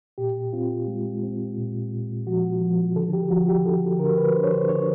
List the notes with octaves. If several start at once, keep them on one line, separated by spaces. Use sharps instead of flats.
A#2 G4
C4 F4
G#3
C4
A#2
A#2
F3 F#4
F3
D3 A4
G4
F3 F#4
G4
D3 A4
D3 A#4
B4
D3 C5
C#5
C5
D3 C#5